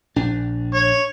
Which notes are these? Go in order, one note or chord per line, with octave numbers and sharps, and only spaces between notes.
A#1 D4
C#5